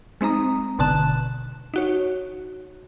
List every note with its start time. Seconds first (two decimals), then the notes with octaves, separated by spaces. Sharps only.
0.21 G#3 C4 D#4 A#5 D#6
0.79 G#1 B2 D3 A5 F#6 E7
1.74 D#4 F#4 C#5